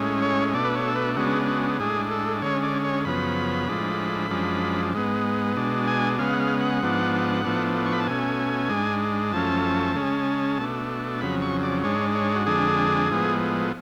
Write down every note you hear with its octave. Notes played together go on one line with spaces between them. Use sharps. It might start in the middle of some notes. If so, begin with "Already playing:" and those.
Already playing: A2 G#3 C#4
C#5
B2 A3 D4 D5
B4
C#5
A4
B4
C#3 G#3 B3 D4 F#4
F#4
A2 G#3 D4 G#4
A4
D3 G#3 C#4 C#5
D5
C#5
F#2 C#3 F3 B3 B5
A2 F3 G#3 D4
F#2 F3 G#3 D4
G#2 G#3 B3
B2 G#3 D4
G#5
C#3 G#3 B3 F5
F#5
F5
F#5
G#2 F3 B3 D4
A2 F3 B3 D4
C#6
B5
A5
B2 A3 C#4 G#5
G#2 G#3 D4
F#2 F3 A3 C#4 A5
C#3 G#3 C#4
B2 A3 D4
F2 C#3 F#3 B5
C#6
D5
G#2 G#3 D4 C#5
C#5
F#4
F2 D3 G#3 D4 G#4
A2 F3 G#3 B3